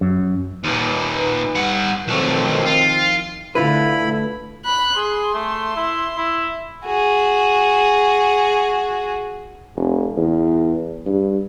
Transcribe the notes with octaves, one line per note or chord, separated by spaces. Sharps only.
F#2
D#2 A#2 D#4 B4
G2 F#5
B1 D#3 F3 A3 C4
F4
D3 A3 E4 F4 B4 B5
B5 F#6
G#4 C6
A3
E4
E4
F#4 G#4
F1
E2
G2